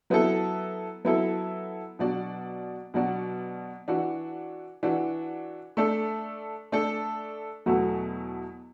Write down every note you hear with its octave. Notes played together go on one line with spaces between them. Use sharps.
F#3 B3 E4 A4
F#3 B3 E4 A4
B2 F#3 D4 F#4 D5
B2 F#3 D4 F#4 D5
E3 D4 F#4
E3 D4 F#4
A3 D4 A4
A3 D4 A4
E2 B2 F#3 A3 F#4